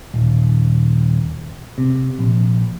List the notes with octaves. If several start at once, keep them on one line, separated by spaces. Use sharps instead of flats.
D#1
C3
A#1